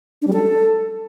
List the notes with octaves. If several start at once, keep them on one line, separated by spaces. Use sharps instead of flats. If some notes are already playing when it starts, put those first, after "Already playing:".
D4
G3
A4